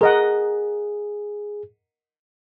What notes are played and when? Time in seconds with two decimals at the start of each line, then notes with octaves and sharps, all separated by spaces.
0.01 G#4 A#4 D#5 F#5